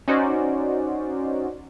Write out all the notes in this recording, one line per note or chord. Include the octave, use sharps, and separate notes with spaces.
C#4 D#4 F#4 C5 D5